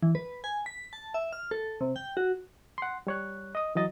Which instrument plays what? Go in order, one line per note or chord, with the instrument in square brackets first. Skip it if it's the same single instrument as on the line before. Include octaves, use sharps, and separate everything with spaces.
[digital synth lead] E3
B4
G#5
B6
A5
E5
F6
A4
C3
G5
F#4
[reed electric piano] F#5 C6
G3 C#5 F#6
D#5 D#6
E3 F#3 D#5 A6